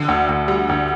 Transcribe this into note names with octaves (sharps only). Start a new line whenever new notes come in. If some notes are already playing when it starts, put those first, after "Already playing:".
Already playing: D3
D2
D2
G3
D2